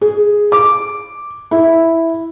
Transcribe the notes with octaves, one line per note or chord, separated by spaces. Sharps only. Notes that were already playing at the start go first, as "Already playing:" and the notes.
G#4
D6
E4